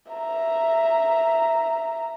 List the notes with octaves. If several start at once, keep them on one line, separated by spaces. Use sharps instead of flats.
E5 A#5